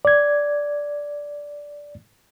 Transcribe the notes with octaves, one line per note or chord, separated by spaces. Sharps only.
D5 G#6